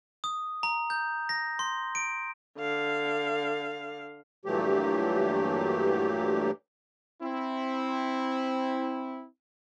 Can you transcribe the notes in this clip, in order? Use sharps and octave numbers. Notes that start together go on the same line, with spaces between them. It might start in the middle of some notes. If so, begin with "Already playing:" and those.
D#6
A#5
G6
A#6
C6
D7
D3 F5
G2 A#2 E3 F#3 A3 G4
C4 E4